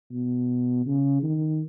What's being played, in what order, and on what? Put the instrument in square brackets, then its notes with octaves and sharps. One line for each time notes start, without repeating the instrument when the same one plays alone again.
[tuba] B2
C#3
D#3